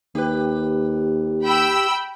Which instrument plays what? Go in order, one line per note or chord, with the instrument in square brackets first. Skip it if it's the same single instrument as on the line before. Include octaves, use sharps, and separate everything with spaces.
[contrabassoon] D#2 [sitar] G4 B4
[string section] G5 B5 E6